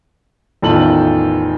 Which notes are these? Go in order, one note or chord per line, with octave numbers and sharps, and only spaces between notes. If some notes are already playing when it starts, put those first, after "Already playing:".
A1 E2 D#3 F4 A4 F#7